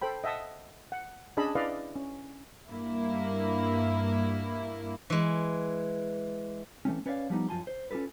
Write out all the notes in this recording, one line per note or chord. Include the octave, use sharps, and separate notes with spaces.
A4 C5 G5 B5
D#5 E5 F#5 A5 D#6
F#5
C#4 D4 G#4 D#5 A5 B5
E4 B4 D5 D#5 F5
C#4
G2 A#3 E4
E3 G#3
E3 A3 C4 C#4
C#4 B4 C#5 D5 E5 F5
F3 G3 B3 D#4
F#2 F3 F4 G#5 A5 C6
C5
C#4 F4 G4 A4 B4